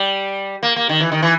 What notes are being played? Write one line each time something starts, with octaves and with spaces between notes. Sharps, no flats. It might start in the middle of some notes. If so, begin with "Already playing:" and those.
Already playing: G3
A#3
A#3
D#3
E3
D#3
E3